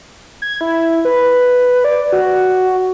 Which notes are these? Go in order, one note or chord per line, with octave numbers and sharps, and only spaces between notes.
G#6
E4
B4
D5
F#4